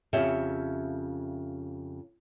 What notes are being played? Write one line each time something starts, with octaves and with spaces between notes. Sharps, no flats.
F2 C#3 G4 C#5 E5